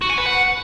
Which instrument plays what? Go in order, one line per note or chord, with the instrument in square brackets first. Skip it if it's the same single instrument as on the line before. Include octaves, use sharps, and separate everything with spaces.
[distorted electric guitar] F#4
G#5
B4
F#5